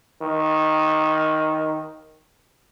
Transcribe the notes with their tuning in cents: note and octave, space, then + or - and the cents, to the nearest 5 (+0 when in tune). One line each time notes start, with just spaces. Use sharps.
D#3 +5